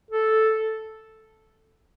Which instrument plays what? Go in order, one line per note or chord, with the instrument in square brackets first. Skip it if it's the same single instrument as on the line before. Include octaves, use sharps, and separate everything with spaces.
[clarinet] A4